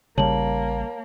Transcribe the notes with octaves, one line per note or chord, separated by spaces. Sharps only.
A1 C#3 G3 A#3 C#5 A5 F#7